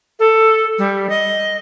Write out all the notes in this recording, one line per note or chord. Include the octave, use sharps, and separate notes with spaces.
A4
G3
D#5